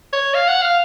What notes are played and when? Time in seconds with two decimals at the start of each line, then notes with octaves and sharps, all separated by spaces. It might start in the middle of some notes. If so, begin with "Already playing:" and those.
0.13 C#5
0.34 F5
0.48 F#5
0.62 F5